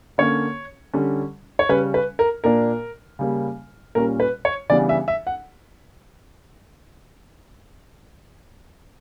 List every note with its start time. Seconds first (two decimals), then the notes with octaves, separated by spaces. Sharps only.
0.18 D3 A#3 C#4 C#5
0.94 D3 G3 C#4
1.59 C#5
1.69 C#3 G3 C#4 B4
1.94 B4
2.19 A#4
2.44 A#2 A#3 D4 A#4
3.19 C#3 G3 A#3
3.95 A#2 G3 C#4 A#4
4.20 B4
4.45 C#5
4.69 C#3 E3 G3 B3 D4 D5
4.89 E5
5.08 E5
5.27 F#5